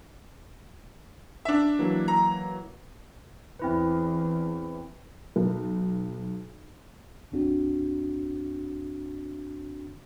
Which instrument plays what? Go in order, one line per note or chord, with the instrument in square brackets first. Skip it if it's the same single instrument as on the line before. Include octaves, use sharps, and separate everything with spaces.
[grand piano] D4 E5
[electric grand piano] E3 F#3 A#3
[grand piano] A#5
[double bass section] E2 [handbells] C4 E4 B4
[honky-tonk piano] B1
[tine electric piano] A1 F2 C4 D4 F#4